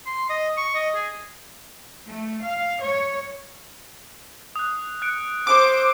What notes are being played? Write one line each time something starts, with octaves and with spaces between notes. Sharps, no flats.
C6
D#5
C#6
D#5
G#4
A3
F5
C#5
D#6 F#6
F#6 C#7 D7
C5 D6 E6 D7